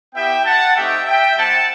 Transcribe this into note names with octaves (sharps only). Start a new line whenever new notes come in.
B3 E4 G4 E5 G5
F#5 A5
A3 C4 D#4 G4 E5 G5
E5 G5
G3 C4 E4 F#5 A5